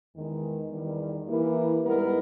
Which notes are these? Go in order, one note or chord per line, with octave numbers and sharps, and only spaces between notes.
E2 D#3 G#3
E2 D#3 G3
E3 A#3 E4 G4 A#4
G#2 G3 B3 E4 A#4